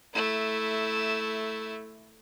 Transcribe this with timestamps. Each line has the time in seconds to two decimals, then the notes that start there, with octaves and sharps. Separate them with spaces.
0.14 A3 E4